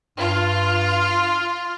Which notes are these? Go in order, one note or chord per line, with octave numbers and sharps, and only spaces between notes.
G2 F4